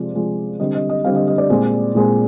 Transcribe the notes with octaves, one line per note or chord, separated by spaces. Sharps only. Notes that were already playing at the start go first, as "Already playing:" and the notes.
Already playing: C3 F3 G#3 D5
C3 F3 G#3
D3 G3 C4 D#5
D#5
D#5
D3 G3 C4 F5
D#5
D#5
D5
A#2 G#3 C4
A#2 G#3 C4